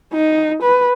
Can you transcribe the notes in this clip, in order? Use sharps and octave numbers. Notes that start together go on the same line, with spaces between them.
D#4
B4